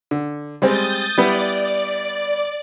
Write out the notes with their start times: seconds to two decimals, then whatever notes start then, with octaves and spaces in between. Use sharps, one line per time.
0.11 D3
0.62 G3 G#3 C4 D#6 G6 A6
1.18 G3 B3 E4 D5